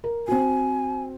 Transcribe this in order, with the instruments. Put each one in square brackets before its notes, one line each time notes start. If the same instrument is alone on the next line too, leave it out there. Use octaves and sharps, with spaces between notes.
[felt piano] A#4
[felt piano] C4 F#4 [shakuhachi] G#5